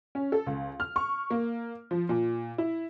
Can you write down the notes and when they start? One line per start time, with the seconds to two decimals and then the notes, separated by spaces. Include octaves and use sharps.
0.15 C#4
0.32 A4
0.46 C#2
0.80 F6
0.96 C#6
1.30 A#3
1.91 F3
2.09 A#2
2.58 E4